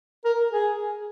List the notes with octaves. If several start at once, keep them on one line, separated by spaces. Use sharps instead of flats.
A#4
G#4